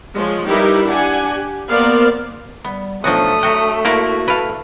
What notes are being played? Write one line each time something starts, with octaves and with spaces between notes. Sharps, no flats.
F3 G#3 C#5
G3 D#4 E4 G4 A#4 B4
D4 G4 F#5 G#5
G4
A#3 B3 A#4 C5 D5 F5
G3 B3
B1 F3 A3 D4 F#4 F#5 D#6
F#3 F#4 F#5 G5
A#3 E4 F#4 C5 D5 F#5
E4 A4 B4 F5